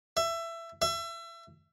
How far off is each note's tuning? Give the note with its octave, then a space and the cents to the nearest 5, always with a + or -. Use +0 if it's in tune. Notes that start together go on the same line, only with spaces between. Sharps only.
E5 +20
E5 +30